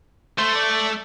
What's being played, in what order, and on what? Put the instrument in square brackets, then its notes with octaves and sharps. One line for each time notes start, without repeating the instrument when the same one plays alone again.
[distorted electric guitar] A3 [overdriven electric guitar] C5
[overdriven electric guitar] D5